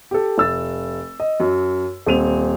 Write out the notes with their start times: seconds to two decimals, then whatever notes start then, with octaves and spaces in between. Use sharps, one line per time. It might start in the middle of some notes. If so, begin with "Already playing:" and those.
0.11 G4 A4
0.38 F1 E6 A6
1.20 D#5
1.40 F#2
2.06 D#1 C4 D#7 F7